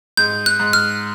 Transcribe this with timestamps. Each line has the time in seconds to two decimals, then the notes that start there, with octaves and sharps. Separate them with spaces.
0.17 G#2 G6
0.46 F#6
0.60 G#2
0.73 F6